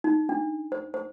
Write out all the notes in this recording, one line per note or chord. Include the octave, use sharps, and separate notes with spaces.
D#4
D4
C5
C5